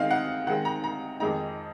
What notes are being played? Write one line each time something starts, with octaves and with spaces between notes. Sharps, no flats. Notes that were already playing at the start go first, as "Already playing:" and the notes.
Already playing: D#3 G#3 C4 D#4 F5
F#5
D#3 G#3 C4 F#5
A#5
A#5
F2 D#3 G#3 D#4 A#5